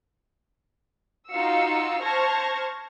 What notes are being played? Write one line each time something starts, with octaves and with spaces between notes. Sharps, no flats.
D#4 F4 F#4 F5 E6 C#7
C5 A5 C#6 F6 G#6 A#6